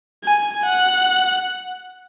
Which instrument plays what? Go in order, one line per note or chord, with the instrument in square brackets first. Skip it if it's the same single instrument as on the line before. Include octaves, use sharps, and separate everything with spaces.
[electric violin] G#5
F#5